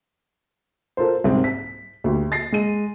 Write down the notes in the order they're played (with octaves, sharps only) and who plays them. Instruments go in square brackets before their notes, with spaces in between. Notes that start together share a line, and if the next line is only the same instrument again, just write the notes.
[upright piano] F4 A4 A#4 C5
C2 G#2 C4
B6
D2 G4
A6 A#6 C7
G#3 D#7